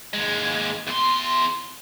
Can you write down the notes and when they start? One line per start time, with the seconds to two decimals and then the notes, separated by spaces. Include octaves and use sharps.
0.13 D#2 G#3
0.87 E2 C6